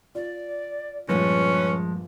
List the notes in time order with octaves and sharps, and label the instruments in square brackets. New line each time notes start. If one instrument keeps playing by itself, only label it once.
[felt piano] F4 [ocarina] D5
[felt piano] A#1 G2 [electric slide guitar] F3 G#3 [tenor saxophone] C#4 [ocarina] B4